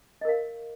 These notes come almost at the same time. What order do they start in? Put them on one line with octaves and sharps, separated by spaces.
D#5 A#4 F5